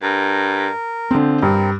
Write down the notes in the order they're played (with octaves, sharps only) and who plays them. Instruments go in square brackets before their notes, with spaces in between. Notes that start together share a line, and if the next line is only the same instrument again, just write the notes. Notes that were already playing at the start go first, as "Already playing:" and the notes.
[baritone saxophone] G2 [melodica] A#4
[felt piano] D3 C4 [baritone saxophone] F3
[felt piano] G2 [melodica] C4 A#4